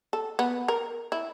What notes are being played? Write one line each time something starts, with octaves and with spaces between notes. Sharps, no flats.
A4
B3
A#4
E4